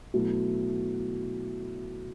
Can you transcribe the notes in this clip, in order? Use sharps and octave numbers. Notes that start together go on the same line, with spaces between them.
B2 F#3 A3 E4